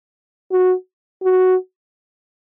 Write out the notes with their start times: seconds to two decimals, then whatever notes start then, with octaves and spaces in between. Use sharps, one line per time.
0.52 F#4
1.23 F#4